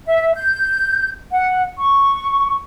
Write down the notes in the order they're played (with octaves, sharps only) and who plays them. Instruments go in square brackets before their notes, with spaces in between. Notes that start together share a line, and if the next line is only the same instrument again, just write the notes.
[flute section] E5
G6
F#5
C#6